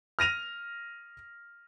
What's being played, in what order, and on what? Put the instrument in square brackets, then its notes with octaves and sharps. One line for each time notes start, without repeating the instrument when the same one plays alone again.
[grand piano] F6 A#6 D#7 F7